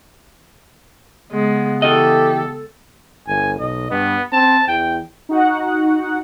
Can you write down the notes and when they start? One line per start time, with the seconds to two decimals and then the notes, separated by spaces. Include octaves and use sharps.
1.32 C#3 G#3 B3
1.82 E3 G4 A4 D#5
3.27 G1 G#5
3.59 B1 D#5
3.91 G2 B3
4.32 C4 A5
4.68 E2 G5
5.29 D#4 F#4 F#5